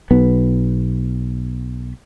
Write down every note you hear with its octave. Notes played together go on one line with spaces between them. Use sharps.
B1 B3